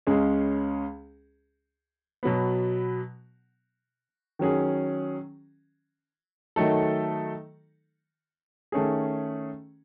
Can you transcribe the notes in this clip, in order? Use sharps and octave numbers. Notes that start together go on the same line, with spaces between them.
C#2 C#3 G#3 C#4 G#4
B2 F#3 B3
D#3 F#3 C#4 G#4
D#3 F#3 A3 D#4 A4
D#3 A3 C#4 G#4